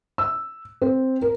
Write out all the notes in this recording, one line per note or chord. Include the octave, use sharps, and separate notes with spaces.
E6
C4
A#4